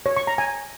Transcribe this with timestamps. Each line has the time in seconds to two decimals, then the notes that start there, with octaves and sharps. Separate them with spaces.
0.06 C#5
0.17 C#6
0.27 A#5
0.38 G#5